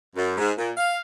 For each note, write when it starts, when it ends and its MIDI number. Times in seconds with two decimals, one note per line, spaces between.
0.16 0.33 42
0.38 0.52 44
0.58 0.70 46
0.77 1.00 77